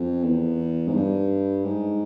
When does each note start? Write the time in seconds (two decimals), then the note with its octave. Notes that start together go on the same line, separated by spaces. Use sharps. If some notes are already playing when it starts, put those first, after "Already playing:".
Already playing: F2
0.23 E2
0.88 G#2
0.94 G2
1.64 G#2